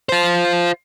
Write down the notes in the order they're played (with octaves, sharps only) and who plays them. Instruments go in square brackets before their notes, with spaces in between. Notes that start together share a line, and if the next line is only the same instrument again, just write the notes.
[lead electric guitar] F4 C5